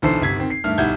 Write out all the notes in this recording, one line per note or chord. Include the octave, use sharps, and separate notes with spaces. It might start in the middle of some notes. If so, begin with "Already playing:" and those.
B1 D3 E3 A4 C5 C7
G1 C3 G#6 B6
D#3 C4
C7
G2 D#3 A3 F6
B1 G3 E4 F#5 G6 G#6